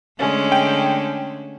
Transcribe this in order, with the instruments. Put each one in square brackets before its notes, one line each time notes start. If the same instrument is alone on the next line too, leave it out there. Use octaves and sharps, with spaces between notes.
[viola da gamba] D3 A3 [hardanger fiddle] G#3 C#4
[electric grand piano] G5